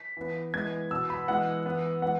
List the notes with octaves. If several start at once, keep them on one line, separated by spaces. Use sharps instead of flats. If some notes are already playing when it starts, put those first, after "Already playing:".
Already playing: B6
E3 B3
E3 G#3 B3 G#6
B2 B3 E6
B5
E3 G#3 B3 F#5
E3 B3
E3 G#3 B3 F#5